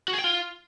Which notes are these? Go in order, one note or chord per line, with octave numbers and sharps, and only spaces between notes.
F#4
G#4
G5
F4